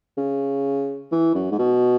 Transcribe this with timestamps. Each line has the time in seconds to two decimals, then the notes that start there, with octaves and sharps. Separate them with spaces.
0.18 C#3
1.12 E3
1.35 F#2
1.51 G#2
1.59 B2